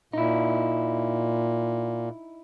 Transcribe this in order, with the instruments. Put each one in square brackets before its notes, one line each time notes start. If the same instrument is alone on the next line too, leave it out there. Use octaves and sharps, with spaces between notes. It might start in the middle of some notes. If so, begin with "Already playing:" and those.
[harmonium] A#2 [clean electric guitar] D#4 E4